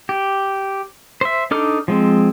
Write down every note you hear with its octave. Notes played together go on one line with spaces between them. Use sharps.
G4
C5 E5
D4 D#4 A4 D6 F6
F3 G#3 C4